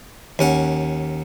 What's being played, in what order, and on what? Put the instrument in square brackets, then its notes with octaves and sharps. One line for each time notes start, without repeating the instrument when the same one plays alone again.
[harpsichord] D#2 C#4 F#5